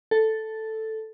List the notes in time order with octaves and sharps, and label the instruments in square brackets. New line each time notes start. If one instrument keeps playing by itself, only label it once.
[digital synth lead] A4